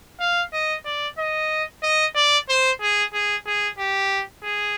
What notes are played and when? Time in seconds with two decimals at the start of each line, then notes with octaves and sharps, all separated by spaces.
0.20 F5
0.53 D#5
0.86 D5
1.19 D#5
1.83 D#5
2.16 D5
2.49 C5
2.82 G#4
3.14 G#4
3.47 G#4
3.79 G4
4.43 G#4